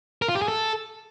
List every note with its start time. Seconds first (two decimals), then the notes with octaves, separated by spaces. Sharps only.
0.22 A#4
0.29 F4
0.35 G4
0.42 G#4
0.48 A4